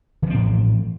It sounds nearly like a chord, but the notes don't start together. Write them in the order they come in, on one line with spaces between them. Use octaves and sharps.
E3 F3 C4 A2